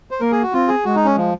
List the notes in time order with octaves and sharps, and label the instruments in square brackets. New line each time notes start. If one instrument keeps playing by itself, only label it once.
[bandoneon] C5
[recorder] A#3 [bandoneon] A#4
[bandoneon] G#4
F#4
[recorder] C4 [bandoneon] F4
[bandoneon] G#4
[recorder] G#3 [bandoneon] F#4
[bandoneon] D#4
C#4
F3